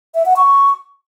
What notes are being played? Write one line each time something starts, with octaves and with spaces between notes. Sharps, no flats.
E5
F#5
C#6